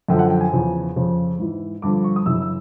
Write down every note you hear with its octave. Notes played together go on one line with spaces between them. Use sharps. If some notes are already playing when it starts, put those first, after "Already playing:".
F#2 D3 F3 G5
F#5
G5
G#5
E2 C#3 F3
F2 C#3 F3
G#2 E3
G2 D3 F3 D6
C#6
D#6
F#2 C#3 E3 E6
E6